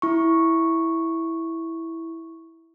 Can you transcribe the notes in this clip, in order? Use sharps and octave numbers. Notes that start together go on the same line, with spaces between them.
E4 C#6